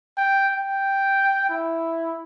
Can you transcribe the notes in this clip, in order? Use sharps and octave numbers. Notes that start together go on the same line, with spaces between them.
G5
G5
E4